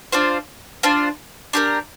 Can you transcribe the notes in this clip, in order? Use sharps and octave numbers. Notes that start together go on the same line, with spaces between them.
D4 F4 C5
D4 F4 C5
D4 G4 A#4